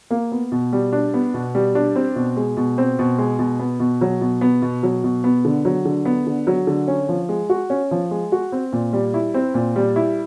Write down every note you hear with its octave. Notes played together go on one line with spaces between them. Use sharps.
A#3
B3
B2
G3
D4
B3
B2
G3
D4
C4
B2
G#3
B2
C4
B2
G#3
B2
B3
B2
F#3
B2
B3
B2
F#3
B2
B3
D3
F#3
D3
B3
D3
F#3
D3
C#4
F3
G#3
F#4
C#4
F3
G#3
F#4
C4
A#2
G3
E4
C4
A#2
G3
E4